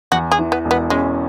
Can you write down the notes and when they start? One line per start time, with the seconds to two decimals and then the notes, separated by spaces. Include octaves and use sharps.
0.12 E2 F#4
0.32 G#4
0.39 E3
0.52 B3
0.65 E1
0.71 B3
0.90 G#3 C#4